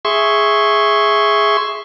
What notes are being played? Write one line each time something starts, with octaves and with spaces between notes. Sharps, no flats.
G#4 E5 C6 C#6